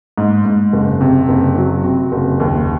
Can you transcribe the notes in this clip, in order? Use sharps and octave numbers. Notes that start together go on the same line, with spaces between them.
G#2
G#2
F#1
C3
F#1
F#3
C3
F#1
D#2